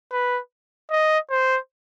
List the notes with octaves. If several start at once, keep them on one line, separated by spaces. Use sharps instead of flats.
B4
D#5
C5